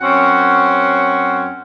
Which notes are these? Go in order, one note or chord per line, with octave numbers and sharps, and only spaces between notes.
F#2 C4 C#4 F#4 C5 F#5